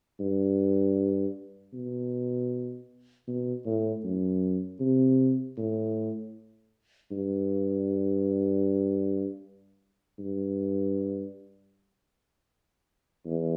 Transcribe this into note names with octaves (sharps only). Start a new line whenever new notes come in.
G2
B2
B2
A2
F#2
C3
A2
G2
G2
E2